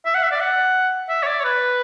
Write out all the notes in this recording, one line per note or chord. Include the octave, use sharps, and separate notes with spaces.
E5
F#5
E5
D5
F#5
E5
C#5
D5
C#5
B4